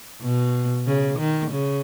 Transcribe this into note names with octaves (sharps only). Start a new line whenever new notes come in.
B2
C#3
D#3
C#3